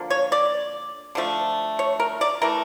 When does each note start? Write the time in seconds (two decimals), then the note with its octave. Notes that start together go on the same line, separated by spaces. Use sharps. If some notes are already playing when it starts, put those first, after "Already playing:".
Already playing: D3 F3 A#3
0.10 C#5
0.32 D5
1.15 D3 F3 A3
1.79 C#5
2.00 A#4
2.21 D5
2.42 E3 A3 A#4